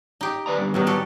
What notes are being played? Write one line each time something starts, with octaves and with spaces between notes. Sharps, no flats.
D#4 G4
B4 D5 A#5
G2 D3
A2 D#3 F#3 G3 B3
F#4 G4 A4